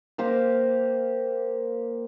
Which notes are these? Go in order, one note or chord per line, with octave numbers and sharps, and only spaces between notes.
A#3 G4 C5 F5